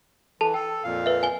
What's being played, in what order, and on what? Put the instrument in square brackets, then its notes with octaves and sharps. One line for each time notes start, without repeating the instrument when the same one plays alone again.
[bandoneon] E3 [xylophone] A4 A5
[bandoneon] A4 [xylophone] G5
[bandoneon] F2 A#2 F5
[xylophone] B4 E5
G#5 G7